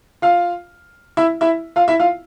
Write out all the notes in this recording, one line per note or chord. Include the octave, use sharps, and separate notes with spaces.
F4 F5
E4 E5
E4 E5
F4 F5
E4 E5
F4 F5